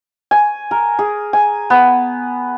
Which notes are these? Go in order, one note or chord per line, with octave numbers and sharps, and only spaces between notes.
G#5
A#4
G#4
G#5
B3